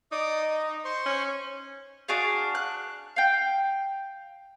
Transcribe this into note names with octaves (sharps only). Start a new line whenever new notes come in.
D#4 D5 D6 D#6
D#5
C5 C6 C#6
C#4
D4 F#4 G#4 F5
F#6
F5 G5